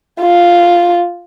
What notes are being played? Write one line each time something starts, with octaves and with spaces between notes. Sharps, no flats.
F4